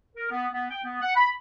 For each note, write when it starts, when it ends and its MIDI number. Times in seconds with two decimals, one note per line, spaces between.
0.16 0.29 70
0.31 0.47 59
0.52 0.67 59
0.71 0.80 79
0.84 1.00 59
1.02 1.12 78
1.16 1.30 83